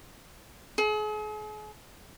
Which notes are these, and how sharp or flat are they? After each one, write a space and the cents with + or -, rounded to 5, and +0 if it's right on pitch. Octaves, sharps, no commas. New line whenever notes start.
G#4 +40